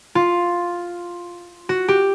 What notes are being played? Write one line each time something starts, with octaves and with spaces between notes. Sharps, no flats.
F4
F#4
G4